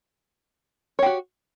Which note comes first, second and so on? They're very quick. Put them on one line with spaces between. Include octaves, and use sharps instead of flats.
C#5 G4 F#4